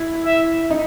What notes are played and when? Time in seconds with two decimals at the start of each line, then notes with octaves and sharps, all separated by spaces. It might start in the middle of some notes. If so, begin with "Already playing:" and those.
Already playing: E4
0.25 E5
0.70 D#4